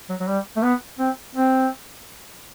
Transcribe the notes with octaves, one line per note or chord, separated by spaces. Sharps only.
F#3
F#3
G3
A3
B3
C4
C4